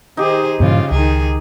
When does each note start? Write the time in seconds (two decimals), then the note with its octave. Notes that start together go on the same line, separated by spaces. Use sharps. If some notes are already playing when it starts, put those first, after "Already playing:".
0.17 D#3 D#4 G4 G#4 C5
0.60 G2 A#2 C#3 E3 F4
0.91 C#2 D#3 G#4